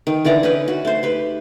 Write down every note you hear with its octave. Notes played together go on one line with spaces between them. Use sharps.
D#3
D3 E3 D5 A#5
C#4 D#4 B4
F#4
A3 C5
G4 B4